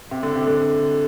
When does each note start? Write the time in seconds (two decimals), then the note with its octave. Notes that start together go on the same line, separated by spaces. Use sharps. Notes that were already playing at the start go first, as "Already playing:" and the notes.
0.11 C3
0.23 D3
0.35 C3
0.47 D3